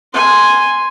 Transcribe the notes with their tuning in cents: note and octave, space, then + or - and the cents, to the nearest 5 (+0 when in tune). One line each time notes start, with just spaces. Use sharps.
G#5 -5 C6 +0